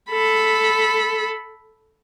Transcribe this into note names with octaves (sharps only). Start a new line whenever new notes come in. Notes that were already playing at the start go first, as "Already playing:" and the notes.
A4 B5